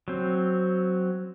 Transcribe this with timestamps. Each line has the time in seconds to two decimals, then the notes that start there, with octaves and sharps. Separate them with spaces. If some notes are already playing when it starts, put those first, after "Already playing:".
0.08 F#3 C4